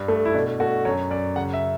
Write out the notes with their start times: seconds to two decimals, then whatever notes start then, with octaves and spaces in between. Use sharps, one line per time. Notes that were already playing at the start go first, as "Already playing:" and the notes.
Already playing: G2
0.08 A3
0.25 E4
0.34 B2 D4
0.60 A3 F#4
0.85 F#2 C#5
1.11 F#2 D5
1.36 C#3 F#5
1.53 E5